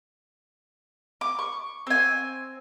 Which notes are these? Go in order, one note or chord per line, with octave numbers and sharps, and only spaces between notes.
D6
C#6
C4 G#5